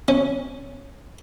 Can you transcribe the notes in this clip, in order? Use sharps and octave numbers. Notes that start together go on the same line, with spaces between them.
C#4